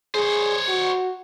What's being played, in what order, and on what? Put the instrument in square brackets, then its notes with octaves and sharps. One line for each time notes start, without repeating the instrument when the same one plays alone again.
[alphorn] G#4 [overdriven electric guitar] C5 C#5
[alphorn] F#4